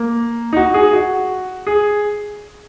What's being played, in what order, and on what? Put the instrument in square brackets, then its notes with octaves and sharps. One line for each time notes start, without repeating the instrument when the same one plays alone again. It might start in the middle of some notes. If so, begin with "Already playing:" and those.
Already playing: [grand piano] A#3
D#4
F#4
G#4
F#4
G#4